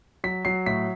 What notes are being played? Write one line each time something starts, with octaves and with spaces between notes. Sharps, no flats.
F#3 B6
F#3 C7
A2 B6